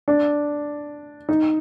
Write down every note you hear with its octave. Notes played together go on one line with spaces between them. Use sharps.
D4
D#4